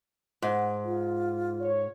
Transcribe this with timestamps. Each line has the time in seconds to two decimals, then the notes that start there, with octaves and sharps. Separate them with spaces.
0.42 G#2
0.84 F4
1.61 C#5